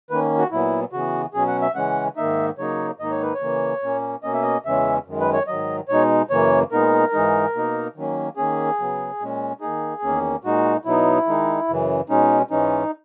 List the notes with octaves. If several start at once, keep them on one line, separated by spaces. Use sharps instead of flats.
D#3 A#3 C#4 B4
F#4
A#2 F#3 B3 E4
C#3 E3 B3 F#4
B2 F#3 C#4 G#4
F#5
E5
C#3 E3 G#3 C#4 F#5
G#2 D#3 A#3 D#4 E5
C#3 F#3 A#3 D#4 C#5
G#2 D#3 A#3 D#4 D#5
C#5
B4
C#5
C#3 E3 A#3
A#2 A#3 C#4
B2 A#3 C#4 D#5
E5
D#5
E2 C#3 E3 G#3 C#4 E5
F#2 D#3 G#3
B4
C#5
G#2 D#3 F#3 D#5
B2 G#3 D#4 C#5
F#2 C#3 E3 A#3 C#5
A#2 G#3 B3 D#4 A#4
G#2 E3 G#3 D#4
B2 A#3 D#4
D#3 F#3 A#3 C#4
D#3 A#3 C#4 G#4
C#3 F#3 B3
A#2 G#3 C#4
D#3 A#3 D#4 G#4
E2 D#3 A#3 C#4
A#2 G#3 D#4 F#4
B2 F#3 B3 D#4 E4
D#3 G#3 D#4
F#2 C#3 E3
B2 G#3 C#4 D#4
G#2 E3 G#3 C#4 D#4